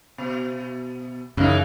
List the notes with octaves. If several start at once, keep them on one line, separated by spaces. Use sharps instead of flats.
B2
F#2 C#3 E3 D#4